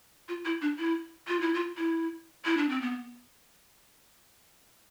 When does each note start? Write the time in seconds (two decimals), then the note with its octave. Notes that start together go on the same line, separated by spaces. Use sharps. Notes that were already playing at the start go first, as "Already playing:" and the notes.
0.29 F4
0.45 E4
0.61 D4
0.78 E4
1.28 F4
1.41 E4
1.54 F4
1.77 E4
2.45 E4
2.57 D4
2.69 C4
2.81 B3